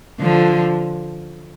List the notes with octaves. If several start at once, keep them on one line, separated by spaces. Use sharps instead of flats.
D3 F3